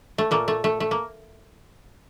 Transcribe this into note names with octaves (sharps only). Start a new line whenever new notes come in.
A3
A#2 A3 A#3
A3
A3
A3
A#3